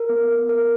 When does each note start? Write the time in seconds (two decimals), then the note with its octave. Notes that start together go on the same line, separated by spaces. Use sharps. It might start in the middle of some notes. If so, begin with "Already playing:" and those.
Already playing: A#4
0.09 B3
0.29 B3
0.49 B3 A#4